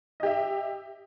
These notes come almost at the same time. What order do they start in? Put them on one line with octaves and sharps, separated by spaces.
D#5 G4 E5